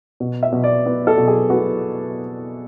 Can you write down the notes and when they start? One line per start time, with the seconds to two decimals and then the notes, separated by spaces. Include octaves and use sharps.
0.20 B2
0.43 E5
0.52 B2
0.64 D5
0.86 B3
1.07 A4
1.17 B2
1.28 G#4
1.50 B3 F#4